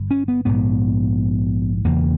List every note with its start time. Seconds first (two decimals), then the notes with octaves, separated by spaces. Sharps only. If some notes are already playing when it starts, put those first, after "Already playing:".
Already playing: G1 G2
0.11 C#4
0.28 B3
0.45 A#1 G#2 B3
1.84 E1 E2 C#3 A#3